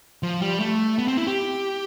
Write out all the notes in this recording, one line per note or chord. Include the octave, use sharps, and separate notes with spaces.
F3
G3
A3
B3
C4
E4
G4